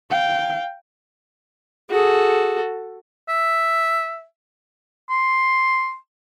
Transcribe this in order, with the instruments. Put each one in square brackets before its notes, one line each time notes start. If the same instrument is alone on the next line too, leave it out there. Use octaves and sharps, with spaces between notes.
[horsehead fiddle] F5 G5
[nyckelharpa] F#4 A4 [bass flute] G#4
[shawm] E5
[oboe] C6